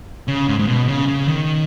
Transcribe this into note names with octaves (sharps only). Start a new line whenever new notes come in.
C#3
G#2
G#2
B2
C#3
C#3
D#3